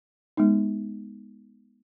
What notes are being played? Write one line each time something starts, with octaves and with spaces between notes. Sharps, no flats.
G#3 B3 D#4